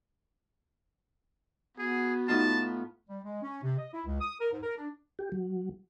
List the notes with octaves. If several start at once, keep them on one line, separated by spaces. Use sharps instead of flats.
B3 F#4 G#4
A2 D#4 F4 A5
G3
G#3
C#4
C3
D#5
E4
C#2
D#6
A#4
G#2
A#4
D4
G4
F#3